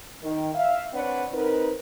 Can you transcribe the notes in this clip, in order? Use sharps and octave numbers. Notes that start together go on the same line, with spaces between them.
D#3
E5 F5
C4 D4 B4 C#5 F#5
C4 D#4 A#4 B4